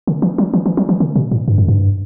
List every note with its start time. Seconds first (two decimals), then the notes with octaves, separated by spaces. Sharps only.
0.07 D3
0.22 E3
0.38 F#3
0.54 E3
0.66 E3
0.77 F#3
0.89 E3
1.00 D3
1.16 B2
1.31 A2
1.48 G2
1.58 F#2
1.68 G2